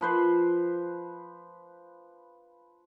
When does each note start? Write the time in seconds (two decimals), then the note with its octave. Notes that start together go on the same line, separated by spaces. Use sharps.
0.01 F3 B4 C5